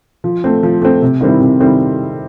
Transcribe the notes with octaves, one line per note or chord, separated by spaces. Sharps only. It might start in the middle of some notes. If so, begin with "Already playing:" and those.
F3
A3 C4
F3
A3 C4
C3
D#3 G3 C4 E4
C3
D#3 G3 C4 E4